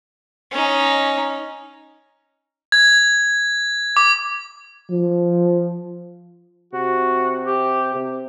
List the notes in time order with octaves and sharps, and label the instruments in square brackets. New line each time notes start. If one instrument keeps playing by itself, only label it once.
[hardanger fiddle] C#4 D#4
[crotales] G#6
D6
[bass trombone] F3
[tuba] C3 [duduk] F#4
[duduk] G4
[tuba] C3